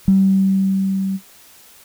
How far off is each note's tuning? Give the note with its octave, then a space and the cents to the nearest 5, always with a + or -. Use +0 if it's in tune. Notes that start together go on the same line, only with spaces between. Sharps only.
G3 -30